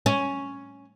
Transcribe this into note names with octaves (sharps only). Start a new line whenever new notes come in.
C#4